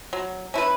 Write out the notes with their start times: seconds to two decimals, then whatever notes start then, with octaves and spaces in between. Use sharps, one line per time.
0.13 F#3
0.54 C#4 E4 B4